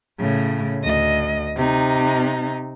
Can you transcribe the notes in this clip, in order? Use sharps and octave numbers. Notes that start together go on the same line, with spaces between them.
A2 C#3
D2 D#5
C3 D#4